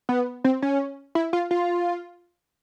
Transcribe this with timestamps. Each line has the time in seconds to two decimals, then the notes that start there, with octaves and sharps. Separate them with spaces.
0.09 B3
0.44 C4
0.62 C#4
1.15 E4
1.33 F4
1.51 F4